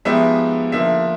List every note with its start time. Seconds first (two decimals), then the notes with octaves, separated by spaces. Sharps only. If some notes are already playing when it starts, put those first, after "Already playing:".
0.05 F3 G#3 B3 D#4 G4 E5
0.72 D3 F3 A#3 E5